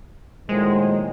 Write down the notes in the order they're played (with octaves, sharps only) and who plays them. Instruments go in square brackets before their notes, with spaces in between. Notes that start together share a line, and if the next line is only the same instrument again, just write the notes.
[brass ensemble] A#2 D#3 F#3 [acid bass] G#3 [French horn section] A3 E4 C5